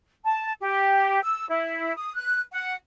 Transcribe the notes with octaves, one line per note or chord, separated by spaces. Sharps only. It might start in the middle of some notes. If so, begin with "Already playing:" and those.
A5
G4
E6
E4
D#6
F#6
F#5